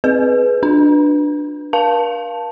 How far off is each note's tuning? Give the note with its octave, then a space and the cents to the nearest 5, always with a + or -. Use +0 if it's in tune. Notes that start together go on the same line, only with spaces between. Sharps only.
C4 +0 G#4 +20 B4 +0
D4 +10 B4 -5
A#4 +45 F5 +0 A5 +0